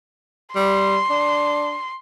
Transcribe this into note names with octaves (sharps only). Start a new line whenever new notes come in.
G3 C6
D4